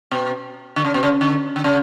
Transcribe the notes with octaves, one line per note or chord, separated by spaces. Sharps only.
B2
D3
C#3
B2
C#3
D3
D3
C#3